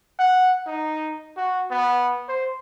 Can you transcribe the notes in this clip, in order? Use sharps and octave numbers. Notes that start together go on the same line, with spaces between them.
F#5
D#4
F#4
B3
C5